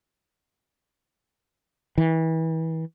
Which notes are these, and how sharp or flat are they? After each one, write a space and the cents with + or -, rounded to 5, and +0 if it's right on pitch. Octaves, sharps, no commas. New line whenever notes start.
E3 -30